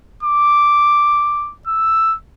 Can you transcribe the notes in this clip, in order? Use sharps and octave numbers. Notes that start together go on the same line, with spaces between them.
D6
E6